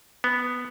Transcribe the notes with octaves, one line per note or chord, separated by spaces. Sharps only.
B3